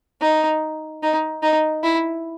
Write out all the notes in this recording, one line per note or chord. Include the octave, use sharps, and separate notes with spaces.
D#4
D#4
D#4
E4